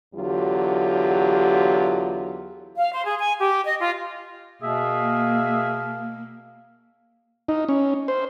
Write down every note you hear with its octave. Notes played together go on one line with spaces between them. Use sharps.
E2 D3 F#3 F4 G4
F5
C5
G#4
G#5
G4
D#5
F4
B2 A#3 G#4 E5 F5
D#4
C#4
C5